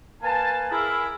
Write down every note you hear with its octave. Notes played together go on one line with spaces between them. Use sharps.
A#3 B4 G#5 A5
E4 G#4 A#4